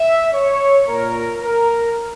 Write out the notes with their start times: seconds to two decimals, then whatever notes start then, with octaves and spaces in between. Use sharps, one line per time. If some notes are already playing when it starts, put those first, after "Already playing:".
Already playing: E5
0.33 C#5
0.87 A#2 A#4
1.42 A#4